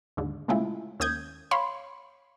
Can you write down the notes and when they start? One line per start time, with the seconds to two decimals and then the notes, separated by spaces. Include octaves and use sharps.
0.17 D#2 G#2 D3
0.48 A#2 C#3 G#3 A3 E4 F4
1.00 D#2 C#4 D#6 G6 G#6
1.51 C#5 F5 B5 C6